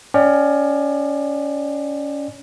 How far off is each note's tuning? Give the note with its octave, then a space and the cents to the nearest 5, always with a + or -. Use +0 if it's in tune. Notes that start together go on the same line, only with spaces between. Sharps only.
C#4 +20 D5 +30 G5 +0